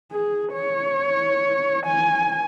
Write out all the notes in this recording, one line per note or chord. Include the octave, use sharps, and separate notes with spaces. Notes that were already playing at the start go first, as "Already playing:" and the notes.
G#4
C#5
G#5